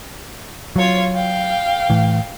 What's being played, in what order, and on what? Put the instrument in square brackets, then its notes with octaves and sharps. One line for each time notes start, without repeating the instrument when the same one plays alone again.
[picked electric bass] F#3 [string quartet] F4 C#5
[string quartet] F5 G5
[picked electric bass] A2 E3